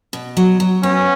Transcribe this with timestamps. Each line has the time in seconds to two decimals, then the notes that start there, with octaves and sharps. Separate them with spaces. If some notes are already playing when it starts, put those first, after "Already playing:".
0.13 B2
0.37 F#3
0.60 F#3
0.83 B3 C#4